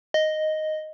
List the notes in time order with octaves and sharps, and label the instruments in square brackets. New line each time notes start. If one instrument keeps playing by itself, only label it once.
[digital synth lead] D#5